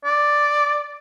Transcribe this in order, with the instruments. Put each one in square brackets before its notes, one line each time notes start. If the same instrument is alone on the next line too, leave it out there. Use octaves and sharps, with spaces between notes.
[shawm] D5